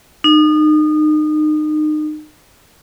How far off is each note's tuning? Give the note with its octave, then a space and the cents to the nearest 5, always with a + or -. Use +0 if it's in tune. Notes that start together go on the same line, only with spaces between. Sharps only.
D#4 -30